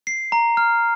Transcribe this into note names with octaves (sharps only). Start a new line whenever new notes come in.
C7
A#5
F6